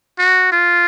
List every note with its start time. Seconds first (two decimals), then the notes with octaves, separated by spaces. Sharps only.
0.19 F#4
0.52 F4